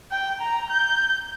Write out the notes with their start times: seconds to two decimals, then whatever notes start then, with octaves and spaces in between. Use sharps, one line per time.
0.11 G5
0.41 A#5
0.71 G6